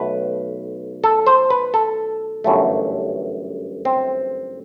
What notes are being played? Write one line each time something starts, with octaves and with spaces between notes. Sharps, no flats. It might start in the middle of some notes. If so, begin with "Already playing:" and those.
Already playing: B1 A3 B4
A4
C5
B4
A4
G1 F#2 E3 A3
C4